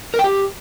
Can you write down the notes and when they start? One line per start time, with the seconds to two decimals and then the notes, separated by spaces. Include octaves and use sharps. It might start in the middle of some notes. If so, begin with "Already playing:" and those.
0.14 A#4
0.19 G5
0.24 G4